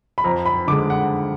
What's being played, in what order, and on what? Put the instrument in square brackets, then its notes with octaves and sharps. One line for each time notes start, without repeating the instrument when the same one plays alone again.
[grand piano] B5
F2 A#5
B5
D3 G#3 D6
F#5